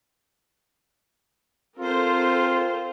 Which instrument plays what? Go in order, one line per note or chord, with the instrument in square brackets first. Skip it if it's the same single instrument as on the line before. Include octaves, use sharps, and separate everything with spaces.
[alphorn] C4 [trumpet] F4 [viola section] A4 A#4 C5